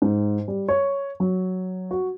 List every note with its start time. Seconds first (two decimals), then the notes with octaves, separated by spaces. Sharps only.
0.02 G#2
0.48 G3
0.68 C#5
1.20 F#3
1.91 F#4